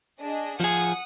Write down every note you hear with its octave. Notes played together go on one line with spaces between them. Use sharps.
D4 G#4 D#5
F3 G#4 F#5 D#6 C#7